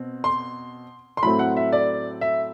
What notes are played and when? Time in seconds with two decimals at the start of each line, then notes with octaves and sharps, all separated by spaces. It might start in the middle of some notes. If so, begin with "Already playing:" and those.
Already playing: B2 C4
0.24 C6
1.17 C6
1.23 A2 F#3 A3 C4 B5
1.39 F#5
1.57 E5
1.72 D5
2.21 E5